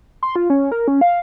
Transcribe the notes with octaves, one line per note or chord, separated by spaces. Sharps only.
C6
F4
C#4
A#4
C#4
F5